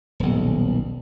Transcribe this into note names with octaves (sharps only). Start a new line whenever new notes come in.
D#1 B1